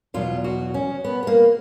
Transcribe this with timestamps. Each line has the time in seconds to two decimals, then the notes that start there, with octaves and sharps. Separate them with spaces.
0.14 E2 B2 F#3 F4
0.44 F#4
0.74 C#4
1.04 B3
1.23 B3
1.27 A#3